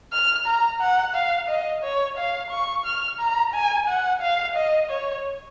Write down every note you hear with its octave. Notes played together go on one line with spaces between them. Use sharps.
F6
A#5
F#5
F5
D#5
C#5
F5
C#6
F6
A#5
G#5
F#5
F5
D#5
C#5